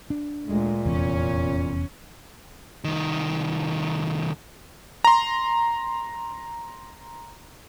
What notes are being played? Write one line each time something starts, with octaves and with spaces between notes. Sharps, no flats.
D4
D2 A#2 G#3 A3
F1 E2 C#4
C2 D#3
A#5 C6